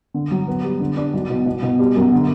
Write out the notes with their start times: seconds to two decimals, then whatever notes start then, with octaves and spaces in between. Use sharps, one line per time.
0.14 D3
0.31 F#3
0.47 B3
0.64 G3
0.80 D3
0.97 D4
1.13 B1
1.30 B2
1.46 B2
1.63 B2
1.79 G3
1.95 F#2
2.12 D3